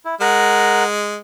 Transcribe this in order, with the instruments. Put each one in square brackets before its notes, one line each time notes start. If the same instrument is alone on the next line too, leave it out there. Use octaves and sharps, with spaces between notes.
[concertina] E4
[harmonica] G#3 [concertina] A#4 F#5